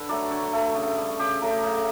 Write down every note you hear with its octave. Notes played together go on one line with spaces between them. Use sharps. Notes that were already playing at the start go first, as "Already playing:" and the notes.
Already playing: D3 A4 B4
F#3 A3 D5
D3 C#5
A3
C#3
G3
C#3 G4
F#3 A3
C#3